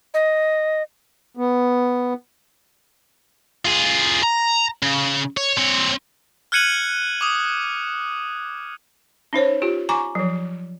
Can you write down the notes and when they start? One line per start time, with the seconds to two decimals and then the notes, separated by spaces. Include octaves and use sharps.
0.14 D#5
1.37 B3
3.65 F4 G#4
4.23 A#5
4.83 C#3
5.37 C#5
5.57 C4 C#5
6.52 F6 F#6 G#6 C#7 D#7 F#7
7.21 D6 D#6
9.33 C#4 D#4 C5 C#5
9.62 F4 G4
9.89 G#5 A#5 C#6 D6
10.15 F3 F#3